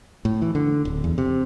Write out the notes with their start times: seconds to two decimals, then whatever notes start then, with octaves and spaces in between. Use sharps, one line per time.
0.25 A2
0.42 E3
0.55 D3
0.85 D1
1.04 E2
1.18 C3